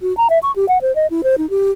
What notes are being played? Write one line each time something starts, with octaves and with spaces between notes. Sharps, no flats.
F#4
A#5
E5
C#6
G4
F#5
C5
D#5
E4
C5
D#4
G4